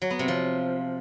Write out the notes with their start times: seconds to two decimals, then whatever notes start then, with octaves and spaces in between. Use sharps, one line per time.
0.02 F#3
0.10 B3
0.19 C3
0.28 F3